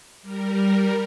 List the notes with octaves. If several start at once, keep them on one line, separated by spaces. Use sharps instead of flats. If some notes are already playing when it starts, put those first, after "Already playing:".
G3 A#4